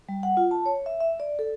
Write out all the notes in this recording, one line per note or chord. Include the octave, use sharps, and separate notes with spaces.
G3
F#5
F4
A5
C#5
E5
E5
D5
A4